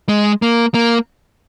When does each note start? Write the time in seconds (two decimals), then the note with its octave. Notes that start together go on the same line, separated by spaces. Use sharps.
0.09 G#3
0.42 A#3
0.74 A#3